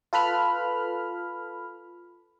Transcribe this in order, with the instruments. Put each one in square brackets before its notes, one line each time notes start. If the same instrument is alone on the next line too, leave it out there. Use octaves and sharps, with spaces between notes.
[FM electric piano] F4 A4 B4 B5 F6